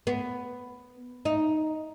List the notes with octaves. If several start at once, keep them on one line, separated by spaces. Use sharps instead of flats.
B3
D#4